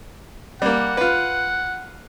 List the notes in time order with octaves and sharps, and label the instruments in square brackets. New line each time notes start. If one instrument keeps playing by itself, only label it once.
[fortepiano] G3 A#3 [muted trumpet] F#5
[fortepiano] F4 B4